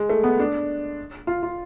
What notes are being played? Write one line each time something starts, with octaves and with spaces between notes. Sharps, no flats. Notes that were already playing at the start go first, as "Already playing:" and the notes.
Already playing: G#3
A3
B3
D4
F4
F4